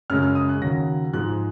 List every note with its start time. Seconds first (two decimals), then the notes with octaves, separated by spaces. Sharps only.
0.10 F#2 C#3 G#3 F6
0.23 F6
0.35 D#6
0.49 F#6
0.62 D#2 C#3 F#3 A#6
1.13 G#2 F3 G#3 F#6